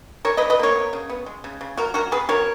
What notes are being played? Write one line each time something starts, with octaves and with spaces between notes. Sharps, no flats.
E3 A#4 C#5
B4 D#5
E3
B4 D#5
A#3 A#4 C#5
B3
C#3
B3
G#3
C#3
C#3
F#3 F#4 A#4
F#3 F#4 A#4
B3 G#4 B4
F#3 A#4 C#5